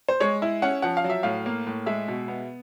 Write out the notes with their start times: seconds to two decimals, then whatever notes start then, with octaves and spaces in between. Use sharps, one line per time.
0.09 C5
0.20 G#3 C#5
0.42 E4
0.62 C#4 F#5
0.82 F3 F#5
0.97 F5
1.04 F#3
1.10 E5
1.23 A2 F5
1.46 A#3
1.67 A2
1.86 G#3 E5
2.08 B2
2.28 B3